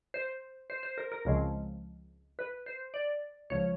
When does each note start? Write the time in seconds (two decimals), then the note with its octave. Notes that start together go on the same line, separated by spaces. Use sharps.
0.14 C5
0.70 C5
0.83 C5
0.98 A#4
1.12 A#4
1.25 C#2 C#3 F3 G#3 C4
2.39 B4
2.66 C5
2.94 D5
3.50 C#2 C#3 F3 C#5